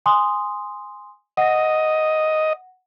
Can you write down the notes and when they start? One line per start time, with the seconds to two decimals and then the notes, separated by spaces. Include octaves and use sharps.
0.06 G#5 C6 D#6
1.37 D#5 F#5 A#6